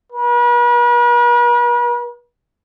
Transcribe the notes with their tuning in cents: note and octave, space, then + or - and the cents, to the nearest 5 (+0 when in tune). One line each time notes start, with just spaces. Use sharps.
B4 -45